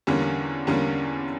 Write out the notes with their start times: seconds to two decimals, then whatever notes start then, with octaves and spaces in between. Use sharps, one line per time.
0.07 E2 D3 G3 A#3 C#4
0.67 E2 D3 G3 A#3 C#4